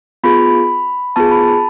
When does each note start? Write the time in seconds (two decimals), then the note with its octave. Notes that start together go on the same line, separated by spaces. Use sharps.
0.24 B3 F4 G#4 B5
1.16 B3 F4 G#4 A5
1.31 B5
1.48 A5